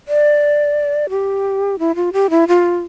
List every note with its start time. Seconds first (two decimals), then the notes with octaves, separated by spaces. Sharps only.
0.08 D5
1.10 G4
1.79 E4
1.95 F4
2.13 G4
2.30 E4
2.48 F4